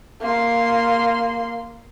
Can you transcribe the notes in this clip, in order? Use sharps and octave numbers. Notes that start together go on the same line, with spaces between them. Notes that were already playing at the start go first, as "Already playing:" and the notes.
A#3 C6